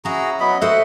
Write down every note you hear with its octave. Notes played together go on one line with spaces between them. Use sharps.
C#4 E4 F#4 G#4 A#5
F#3 B3 D#5 B5
F#4 A4 B4 C5 E5 F#5